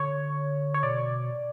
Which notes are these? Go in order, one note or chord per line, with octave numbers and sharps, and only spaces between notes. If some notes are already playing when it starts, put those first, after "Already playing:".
Already playing: D3 C#5
C#5
B2 D5